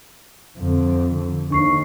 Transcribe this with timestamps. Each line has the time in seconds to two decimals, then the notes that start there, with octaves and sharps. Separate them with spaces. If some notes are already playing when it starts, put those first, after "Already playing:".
0.58 F2 D3
1.50 D#2 D4 C#6 C7